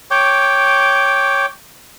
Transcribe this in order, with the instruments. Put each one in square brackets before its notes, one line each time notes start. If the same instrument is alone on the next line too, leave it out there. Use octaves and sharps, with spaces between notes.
[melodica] C#5 G5 D6